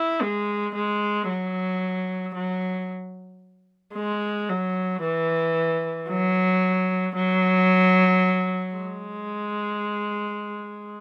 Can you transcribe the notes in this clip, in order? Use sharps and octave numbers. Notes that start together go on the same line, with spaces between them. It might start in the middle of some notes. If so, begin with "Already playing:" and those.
Already playing: E4
G#3
G#3
F#3
F#3
G#3
F#3
E3
F#3
F#3
G#3